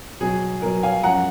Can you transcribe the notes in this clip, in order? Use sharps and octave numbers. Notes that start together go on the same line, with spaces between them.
B2 F#3 G#4
B2 F#3 A#4
F5 G#5
F#2 F3 G#3 F#5 A#5